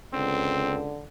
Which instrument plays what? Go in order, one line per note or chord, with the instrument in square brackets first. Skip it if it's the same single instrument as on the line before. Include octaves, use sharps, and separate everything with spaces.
[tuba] C#2 [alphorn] D3 [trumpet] C4